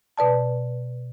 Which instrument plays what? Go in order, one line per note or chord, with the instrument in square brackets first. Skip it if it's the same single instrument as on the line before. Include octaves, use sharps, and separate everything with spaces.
[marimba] B2 B4 D5 A5